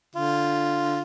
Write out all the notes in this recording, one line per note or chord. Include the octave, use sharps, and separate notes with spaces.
D3 F4